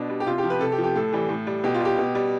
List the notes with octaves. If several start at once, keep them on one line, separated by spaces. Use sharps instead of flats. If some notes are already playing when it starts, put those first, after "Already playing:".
Already playing: B2 D4
G3
G4
C3 F4
G4
F3
B4
C3 A4
G4
F3
G4
A2 A4
E3 G3
A2
G3
B2 G4
F4
G3 G4
B2
G3